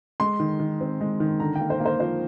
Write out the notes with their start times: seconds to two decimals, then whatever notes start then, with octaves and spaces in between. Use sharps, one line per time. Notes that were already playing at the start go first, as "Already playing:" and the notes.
0.20 G#3 C6
0.40 D#3
0.60 D#3
0.81 C4
1.01 G#3
1.20 D#3
1.40 D3 A#5
1.55 G5
1.61 A#3
1.70 C5
1.80 A#3
1.86 C5
2.00 F3 C5